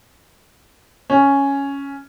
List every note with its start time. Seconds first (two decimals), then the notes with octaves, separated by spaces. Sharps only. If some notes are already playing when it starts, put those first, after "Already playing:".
1.10 C#4